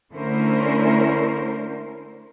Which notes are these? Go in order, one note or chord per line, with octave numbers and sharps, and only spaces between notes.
D3 A3 C#4 E4 A#4 C5